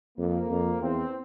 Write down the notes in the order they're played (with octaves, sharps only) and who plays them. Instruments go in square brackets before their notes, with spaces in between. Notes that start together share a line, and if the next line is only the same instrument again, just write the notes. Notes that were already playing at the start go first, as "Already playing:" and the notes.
[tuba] F2 [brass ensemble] A#3
[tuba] F2
[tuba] E2 [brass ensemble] C4